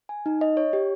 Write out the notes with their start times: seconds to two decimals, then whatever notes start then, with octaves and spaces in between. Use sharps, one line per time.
0.09 G#5
0.26 D#4
0.41 D#5
0.57 C#5
0.73 G4